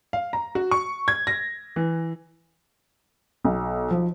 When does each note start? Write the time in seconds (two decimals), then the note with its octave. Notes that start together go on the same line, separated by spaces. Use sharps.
0.13 F5
0.33 A#5
0.55 F#4
0.71 C#6
1.08 G#6
1.27 A#6
1.76 E3
3.44 B1
3.91 F3